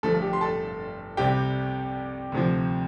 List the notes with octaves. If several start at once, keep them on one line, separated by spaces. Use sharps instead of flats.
G1 G2 F3 A3 A4
A4
G4
C6
A4 A5
C2 C3 G3 G4 G5
D2 C3 F3